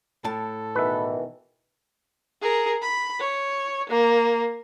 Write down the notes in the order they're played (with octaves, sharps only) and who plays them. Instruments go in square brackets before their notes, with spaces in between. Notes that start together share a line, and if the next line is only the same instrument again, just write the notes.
[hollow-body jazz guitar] A2 A5 [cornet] A4
[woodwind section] B2 D#3 E3 [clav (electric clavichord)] B4 E5
[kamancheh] G#4 A#4
B5
C#5
A#3